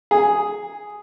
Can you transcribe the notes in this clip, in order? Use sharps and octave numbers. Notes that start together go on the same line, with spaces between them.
G#4